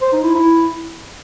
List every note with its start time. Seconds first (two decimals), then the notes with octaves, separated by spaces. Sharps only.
0.02 C5
0.13 D#4
0.24 E4
0.35 E4